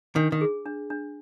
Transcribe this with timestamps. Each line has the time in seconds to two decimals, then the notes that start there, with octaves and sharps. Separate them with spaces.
0.16 D#3 D4
0.32 D#3
0.41 G#4
0.66 D4
0.90 D4